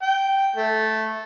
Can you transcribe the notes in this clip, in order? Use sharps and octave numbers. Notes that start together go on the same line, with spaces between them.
G5
A3